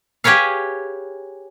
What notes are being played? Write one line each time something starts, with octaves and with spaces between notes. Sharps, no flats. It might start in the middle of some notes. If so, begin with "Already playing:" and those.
G4 G#4 B4 C#5 F5